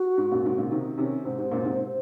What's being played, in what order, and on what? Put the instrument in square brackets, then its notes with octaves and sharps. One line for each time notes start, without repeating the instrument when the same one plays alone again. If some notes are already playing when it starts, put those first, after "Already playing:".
Already playing: [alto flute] F#4
[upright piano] G#2
F#2 A#2
G#2 C3
A#2 C#3
[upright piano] C3 D#3 [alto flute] D#4
[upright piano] C3 D#3 [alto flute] C#4
[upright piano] G#2 C3 [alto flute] C5
[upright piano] G#2 C3
F#2 A#2
G#2 C3